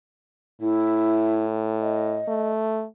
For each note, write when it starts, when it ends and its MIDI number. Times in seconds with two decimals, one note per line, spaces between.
0.61 2.20 45
0.61 1.45 64
1.81 2.51 75
2.28 2.85 57